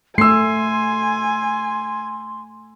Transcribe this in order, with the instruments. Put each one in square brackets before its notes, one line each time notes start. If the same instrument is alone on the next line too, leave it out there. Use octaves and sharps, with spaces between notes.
[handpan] A3 [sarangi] G#5 [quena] C6 [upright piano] E6 C7